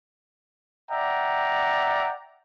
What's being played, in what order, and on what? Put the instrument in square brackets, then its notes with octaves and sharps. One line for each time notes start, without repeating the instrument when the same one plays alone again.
[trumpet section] D5 E5 F#5 G5 A#5